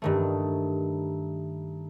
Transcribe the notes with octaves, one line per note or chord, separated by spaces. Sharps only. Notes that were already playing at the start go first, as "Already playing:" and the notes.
G2 D#3 A3